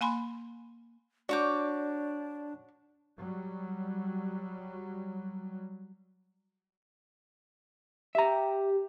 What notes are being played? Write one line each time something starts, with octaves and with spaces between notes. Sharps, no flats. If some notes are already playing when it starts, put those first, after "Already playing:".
A#3 G#5 B5 C6
D4 F#4 C#5 D5 D6 G6
F#3 G3
G4 E5 A#5